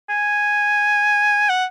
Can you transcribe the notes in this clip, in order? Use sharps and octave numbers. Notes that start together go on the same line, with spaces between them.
G#5
F#5